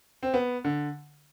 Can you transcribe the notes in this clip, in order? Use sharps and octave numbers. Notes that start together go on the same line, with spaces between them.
C4
B3
D3